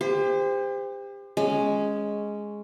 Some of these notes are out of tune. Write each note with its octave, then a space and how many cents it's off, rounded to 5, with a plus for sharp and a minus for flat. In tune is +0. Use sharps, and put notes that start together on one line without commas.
G4 +35 C5 -20
G#3 +0 C#4 +0